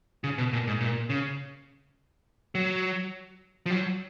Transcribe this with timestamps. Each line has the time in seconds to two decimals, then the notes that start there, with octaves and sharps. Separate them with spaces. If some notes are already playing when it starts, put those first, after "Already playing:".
0.24 C#3
0.38 B2
0.53 A#2
0.67 G#2
0.81 A#2
1.10 C#3
2.55 F#3
3.66 F3
3.70 F#3